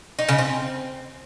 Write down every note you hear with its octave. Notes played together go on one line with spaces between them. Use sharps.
D#4
C#3
C4